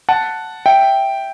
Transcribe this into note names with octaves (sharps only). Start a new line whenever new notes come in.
F#5 A5
E5 G5